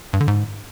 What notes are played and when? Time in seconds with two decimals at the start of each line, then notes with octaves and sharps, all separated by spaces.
0.13 G2
0.21 D3
0.28 G#2